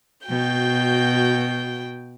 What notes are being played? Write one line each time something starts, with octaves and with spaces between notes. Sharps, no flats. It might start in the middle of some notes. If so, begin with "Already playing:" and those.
B2 F#4 G5 G6